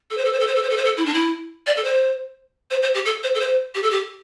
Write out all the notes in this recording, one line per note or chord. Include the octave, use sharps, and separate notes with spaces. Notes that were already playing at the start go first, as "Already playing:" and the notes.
A4
C5
A4
C5
A4
C5
A4
C5
A4
C5
A4
E4
D4
E4
D5
A4
C5
C5
C5
G4
A4
C5
A4
C5
G4
A4
G4